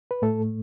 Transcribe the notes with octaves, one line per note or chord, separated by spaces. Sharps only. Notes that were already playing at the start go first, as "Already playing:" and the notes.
B4
A2 A3 A4